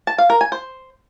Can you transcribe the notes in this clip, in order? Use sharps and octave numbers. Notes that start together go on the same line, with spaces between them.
A5
F5
A#4
G#5
C5